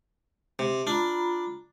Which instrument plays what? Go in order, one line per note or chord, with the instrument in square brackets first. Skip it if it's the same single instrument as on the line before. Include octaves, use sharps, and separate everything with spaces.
[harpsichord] C3
[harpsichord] D4 [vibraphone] F4 A#5 B5